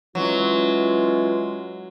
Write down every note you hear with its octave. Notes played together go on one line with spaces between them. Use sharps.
E3 F#3 G#3 C#4 F4